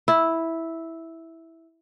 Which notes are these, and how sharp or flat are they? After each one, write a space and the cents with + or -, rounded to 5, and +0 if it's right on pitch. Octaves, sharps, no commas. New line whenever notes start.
E4 -5